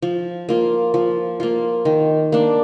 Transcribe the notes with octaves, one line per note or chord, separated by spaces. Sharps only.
F3
A#3 F4
F3
A#3 F4
D#3
A#3 D4